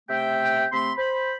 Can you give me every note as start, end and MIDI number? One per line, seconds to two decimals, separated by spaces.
0.09 0.65 48
0.09 0.65 57
0.09 0.65 76
0.09 0.65 79
0.72 0.91 48
0.72 0.91 57
0.72 0.91 60
0.72 0.91 83
0.72 0.91 84
0.97 1.36 72
0.97 1.36 83